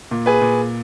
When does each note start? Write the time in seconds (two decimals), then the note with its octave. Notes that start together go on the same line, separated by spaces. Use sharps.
0.11 A#2
0.26 G#4 B4
0.41 A#2